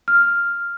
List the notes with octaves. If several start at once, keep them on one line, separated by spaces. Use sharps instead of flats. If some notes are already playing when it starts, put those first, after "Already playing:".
F6